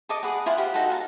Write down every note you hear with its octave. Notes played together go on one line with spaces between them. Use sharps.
A4 D#5 D6
G#4 B4 F#5
E4 F4 C5 F#5
G4 A#4 C5 F#5
D#4 F#4 A4 F#5
F5 G#5 A5